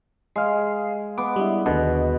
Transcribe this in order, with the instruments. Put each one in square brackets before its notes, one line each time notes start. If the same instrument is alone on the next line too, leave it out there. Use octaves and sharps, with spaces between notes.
[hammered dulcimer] G#3 [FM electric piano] F5 C7
[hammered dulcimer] B3 [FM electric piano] D6
[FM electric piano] G3 D4 E4
[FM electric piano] D#2 D3 [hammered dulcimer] B2